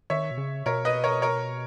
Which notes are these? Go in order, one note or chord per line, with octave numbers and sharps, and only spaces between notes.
D#3 C#5 E5
B2
C#3
B2 A#4 C#5
B4 D#5
A#4 C#5
A#4 C#5